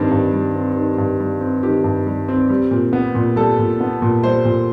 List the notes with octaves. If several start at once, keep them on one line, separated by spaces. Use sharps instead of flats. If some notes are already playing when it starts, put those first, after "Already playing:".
Already playing: G2 D#3 G3 C4 D4
G2
G3
C4
D#3
G2
G3
C4
D#3 G4
G2
G3
C4
G3
A#2
B3
A#2
G3 A4
A#2
B3
A#2
G3 C5
A#2